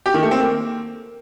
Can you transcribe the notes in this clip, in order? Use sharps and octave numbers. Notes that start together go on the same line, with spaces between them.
G4
D#3
A3
C4
A#3